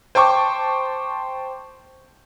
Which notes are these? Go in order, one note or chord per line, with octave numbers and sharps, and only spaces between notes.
C5 G5 A5 C#6 D6